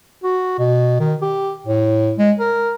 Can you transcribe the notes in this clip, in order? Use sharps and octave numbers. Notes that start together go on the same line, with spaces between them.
F#4
B2
D#3
G4
A2
G#3
A#4